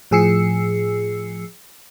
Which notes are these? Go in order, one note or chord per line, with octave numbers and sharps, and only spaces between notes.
A2 F3 G#4 E6 C7 C#7